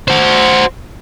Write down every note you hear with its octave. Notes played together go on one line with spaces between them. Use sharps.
F#4 C5